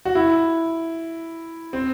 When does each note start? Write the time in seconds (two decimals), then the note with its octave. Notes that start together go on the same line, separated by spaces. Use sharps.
0.05 F#4
0.15 E4
1.73 C4